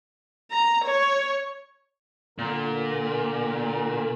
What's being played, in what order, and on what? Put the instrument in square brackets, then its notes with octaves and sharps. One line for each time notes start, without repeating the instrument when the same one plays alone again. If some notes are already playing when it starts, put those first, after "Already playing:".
[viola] A#5
C#5
[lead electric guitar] A#2 [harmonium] D3 A#4